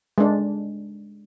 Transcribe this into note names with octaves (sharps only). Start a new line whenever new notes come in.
G#3 D4